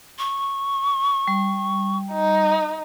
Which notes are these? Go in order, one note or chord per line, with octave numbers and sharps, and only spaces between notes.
C#6
G3
D#4